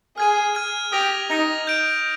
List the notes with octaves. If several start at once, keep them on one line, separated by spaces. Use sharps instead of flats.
G#4 F6 G#6 D#7
F6 G#6 D#7
G4 D#6 A#6 F7
D#4 D#6 A#6 F7
G6 D7